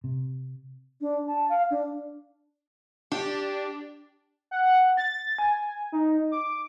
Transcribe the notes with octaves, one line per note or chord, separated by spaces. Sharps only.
C3
D4
A5
F5
D4
D4 G4
F#5
A6
G#5
D#4
D6